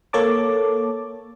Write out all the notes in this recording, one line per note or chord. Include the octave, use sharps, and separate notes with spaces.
A#3 A4 C#5 A5 D6